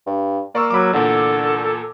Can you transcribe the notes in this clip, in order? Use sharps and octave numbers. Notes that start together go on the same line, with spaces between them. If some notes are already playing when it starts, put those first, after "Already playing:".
G2
A#3 D5 C#6 E6
F#3 B5 D6
E2 A#2 D3 A4